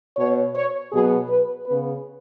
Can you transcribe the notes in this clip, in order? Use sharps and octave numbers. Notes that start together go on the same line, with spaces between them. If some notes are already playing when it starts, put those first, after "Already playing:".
B2 B3 C#5
C#5
B2 F#3 B3 G#4
B4
C#3 B3 B4